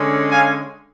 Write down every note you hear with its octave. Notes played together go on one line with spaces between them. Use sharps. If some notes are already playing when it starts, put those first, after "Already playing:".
Already playing: D3 G#3 C#4
F5 G#5